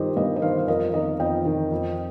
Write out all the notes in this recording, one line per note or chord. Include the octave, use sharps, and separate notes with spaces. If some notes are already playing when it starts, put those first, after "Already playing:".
Already playing: G2 D#3 F4 G4 A#4 C5 D#5
G2 A#4 D#5
D#5
D#3 C5 F5
F5
F2 A#4 D#5
D#3 A#4 D#5
F2 D#5 G5
D#3
F2